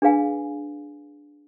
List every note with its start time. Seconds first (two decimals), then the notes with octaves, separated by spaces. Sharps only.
0.02 D4 G#4 B4 F5 G#5